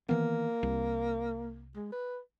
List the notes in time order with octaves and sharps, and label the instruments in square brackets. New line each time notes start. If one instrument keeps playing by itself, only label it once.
[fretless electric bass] D#3 E3 B3 [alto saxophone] A#3
[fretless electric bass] C2
[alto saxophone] G#3
B4